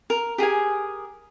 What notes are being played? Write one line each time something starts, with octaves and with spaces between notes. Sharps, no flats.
A#4
G4 G#4 A#4 G#5